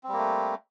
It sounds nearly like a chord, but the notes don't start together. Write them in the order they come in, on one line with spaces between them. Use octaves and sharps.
C4 G3 A#3 A3